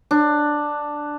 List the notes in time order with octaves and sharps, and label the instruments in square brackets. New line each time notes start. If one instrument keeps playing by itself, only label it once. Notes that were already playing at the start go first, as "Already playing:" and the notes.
[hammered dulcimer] D4